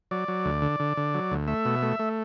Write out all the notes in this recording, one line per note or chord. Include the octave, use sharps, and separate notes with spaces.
F#3 D5
F#3
D2
D3
D3
D3
F#3
D2
A3 E5
B2
A3
A3